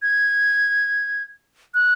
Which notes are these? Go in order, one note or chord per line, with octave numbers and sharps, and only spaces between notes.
G#6
F#6